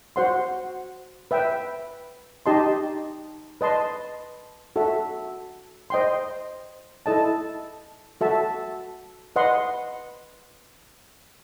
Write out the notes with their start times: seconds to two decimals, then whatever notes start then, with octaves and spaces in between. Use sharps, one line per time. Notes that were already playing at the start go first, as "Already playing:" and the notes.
0.16 F#4 C5 F#5 C6
1.31 B4 E5 G5
2.46 D#4 G4 D#5 A5 C6
3.61 B4 D#5 A5 C6
4.76 F#4 A4 E5
5.90 C5 D#5 G5 C6
7.06 E4 A4 D#5 A5
8.21 F#4 A4 E5 A5
9.36 B4 D#5 F#5 C6